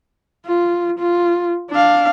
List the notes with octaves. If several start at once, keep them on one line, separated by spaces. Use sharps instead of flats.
F4
F4
D4 F5